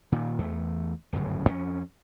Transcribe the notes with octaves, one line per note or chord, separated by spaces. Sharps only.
A#2 D#3
E2 A3
D1 G1 F#2 C#3
F2 C#4